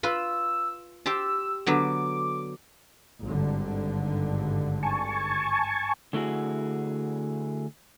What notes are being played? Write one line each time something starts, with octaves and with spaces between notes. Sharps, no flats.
F4 B4 E6
G4 C5 A5 E6
D3 F#3 B3 D6
G#1 G2 D3
G#5 A5 C#6
D3 A3 E4 F#4 G#4